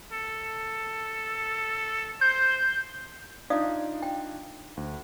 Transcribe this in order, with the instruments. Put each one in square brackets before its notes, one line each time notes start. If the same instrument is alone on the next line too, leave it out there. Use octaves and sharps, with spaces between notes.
[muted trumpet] A4
[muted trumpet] C5 [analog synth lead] G6
[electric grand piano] D4 D#4 F4 [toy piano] D5 F5 D#6
[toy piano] G5
[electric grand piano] D2